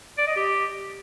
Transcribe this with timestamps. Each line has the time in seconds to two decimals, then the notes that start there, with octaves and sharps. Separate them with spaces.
0.18 D5
0.27 D#5
0.36 G4